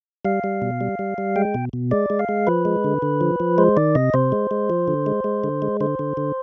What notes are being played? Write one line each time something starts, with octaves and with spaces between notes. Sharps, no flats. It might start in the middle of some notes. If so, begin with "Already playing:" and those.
G3 F5
G3
B2
G3
G3
G3
G#3 G5
B2
B2
G#3 D5
G#3
F5
G#3
F3 B4
G#3
D3
D3
F3
F3
G#3 C5
D#3 D5
C3 D#5
C3 C5
G#3
G#3
F3
D3
G#3
G#3
D3
G#3
D3 C5
D3
D3